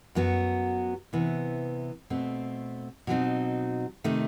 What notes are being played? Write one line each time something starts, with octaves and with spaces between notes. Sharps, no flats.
F#2 F#3 B3 F#4
C3 E3 B3
B2 A3 C4
B2 F#3 C4 D#4
C3 D#3 A3 D#4